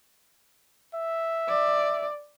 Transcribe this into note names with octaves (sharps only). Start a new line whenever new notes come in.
E5
D5